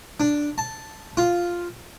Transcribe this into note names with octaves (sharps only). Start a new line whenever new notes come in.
D4
A5
F4